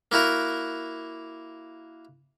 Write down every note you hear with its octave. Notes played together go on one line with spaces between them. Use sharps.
A#3 E4 F#4 A#4